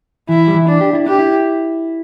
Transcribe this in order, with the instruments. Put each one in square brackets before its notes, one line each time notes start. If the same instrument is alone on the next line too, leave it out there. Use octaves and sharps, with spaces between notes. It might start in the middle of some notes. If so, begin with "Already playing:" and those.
[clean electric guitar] E3 [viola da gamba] E4
[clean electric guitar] G3
E3
[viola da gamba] D4
[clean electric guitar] G4
E4
[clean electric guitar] D4 [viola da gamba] G4
[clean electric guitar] E4